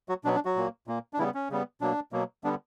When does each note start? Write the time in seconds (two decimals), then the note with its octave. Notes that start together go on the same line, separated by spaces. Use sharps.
0.09 F#3 F#4
0.24 B2 F#3 B3 D4
0.35 D4
0.45 F#3 F#4
0.56 A#2 A#3
0.87 A#2 A#3
1.13 D4
1.18 C#3 E3 G3 B3 E4
1.34 C#4
1.50 C#3 G3 B3
1.81 B2 F#3 A#3 D4
2.12 B2 F#3 A#3
2.44 D3 G3 B3 D4